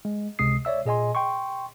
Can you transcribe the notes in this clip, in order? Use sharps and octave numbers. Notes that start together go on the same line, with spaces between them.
G#3
C#2 C3 G#3 D#6 C7
C#5 D5 E5 E6
A#2 G#4 D#5 G#5 C6
G5 C6 C#6